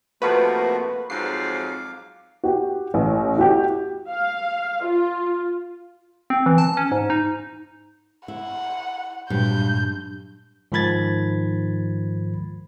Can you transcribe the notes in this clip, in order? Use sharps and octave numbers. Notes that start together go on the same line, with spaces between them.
A2 C3 F3 A3 A#3 F#4 B4
F2 G#2 F#3 F5 D6 C7
F#4 G4
A1
E4 F#4 G4
F5
F4
C4
E3
A5
C#4
G#2
D#4
E4 F#5
G2 A#2 F#3 G#3 G6
G#2 D#3 F3 B5 G#6 A6